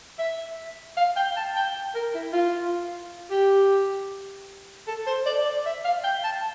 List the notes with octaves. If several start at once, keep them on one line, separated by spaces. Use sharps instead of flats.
E5
F5
G5
A5
G5
A#4
E4
F4
G4
A4
C5
D5
D5
E5
F5
G5
A5